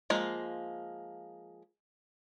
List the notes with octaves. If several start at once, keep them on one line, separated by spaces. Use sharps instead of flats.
F3 G#3 A#3